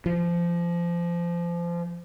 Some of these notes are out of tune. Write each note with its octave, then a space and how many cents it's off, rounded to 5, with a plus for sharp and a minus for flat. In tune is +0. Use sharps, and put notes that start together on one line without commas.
F3 -25